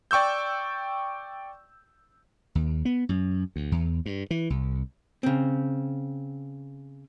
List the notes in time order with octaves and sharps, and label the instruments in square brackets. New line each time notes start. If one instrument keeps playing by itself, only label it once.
[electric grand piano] D5 G5 C#6 E6 G6
[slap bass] D#2
B3
F#2
D2
E2
G2
E3
C2
[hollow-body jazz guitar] C#3 C4